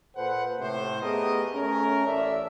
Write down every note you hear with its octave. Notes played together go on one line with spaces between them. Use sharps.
A#2 A4 B4 C5 F#5
A2 C3 C5
A3 B3 G4 G#4 A#4 D#5
A3 C#4 A#4
A1 A4 D5 E5